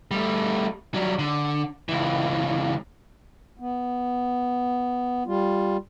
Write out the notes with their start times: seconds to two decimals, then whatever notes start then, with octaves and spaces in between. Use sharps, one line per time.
0.11 G3 A3
0.94 F#3 G3
1.19 D3
1.89 C#2 E3
3.59 B3
5.27 G3 F4